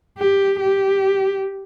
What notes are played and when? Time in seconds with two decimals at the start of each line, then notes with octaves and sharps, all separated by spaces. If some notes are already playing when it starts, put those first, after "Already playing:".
0.18 G4
0.60 G4